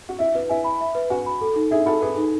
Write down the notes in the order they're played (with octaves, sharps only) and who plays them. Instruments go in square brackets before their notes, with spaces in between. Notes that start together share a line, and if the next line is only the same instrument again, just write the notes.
[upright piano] F#4
[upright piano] E4 [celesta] E5
[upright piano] E4 [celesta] B4
[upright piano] E4 [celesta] G#5
[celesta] B5
E5
B4
[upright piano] F#4 [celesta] G#5
[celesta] B5
A4
D#4
[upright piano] E4 G#4 [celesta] E5
[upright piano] F#4 A4 [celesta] B5
[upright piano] G#4 B4 [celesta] A4
[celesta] D#4